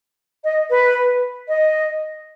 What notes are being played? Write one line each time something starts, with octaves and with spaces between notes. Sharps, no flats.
D#5
B4
D#5